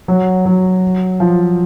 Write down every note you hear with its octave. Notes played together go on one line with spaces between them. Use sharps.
F#3
F#3
F3